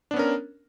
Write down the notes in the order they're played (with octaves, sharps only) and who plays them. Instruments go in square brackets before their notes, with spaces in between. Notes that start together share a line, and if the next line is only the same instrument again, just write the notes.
[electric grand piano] D4
B3
C#4
A#4